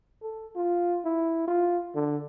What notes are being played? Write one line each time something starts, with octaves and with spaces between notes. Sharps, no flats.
A4
F4
E4
F4
D3